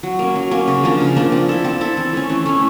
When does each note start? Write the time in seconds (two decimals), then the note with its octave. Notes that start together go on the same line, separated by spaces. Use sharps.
0.03 F#3
0.19 A#3 C#4
0.36 F#3
0.51 A#3 C#4
0.68 C#3
0.84 F3 A#3 D4
1.00 C#3
1.16 F3 A#3 D4
1.32 C4
1.49 E4 A4
1.64 C4
1.81 E4 A4
1.97 E3
2.13 A3 C#4
2.30 E3
2.46 A3 C#4